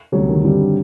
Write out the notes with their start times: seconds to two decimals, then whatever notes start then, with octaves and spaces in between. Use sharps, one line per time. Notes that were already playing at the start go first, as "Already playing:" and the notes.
0.12 D2 C3 F#3 G3
0.28 D#3
0.44 G2 D3 G3 C4 G4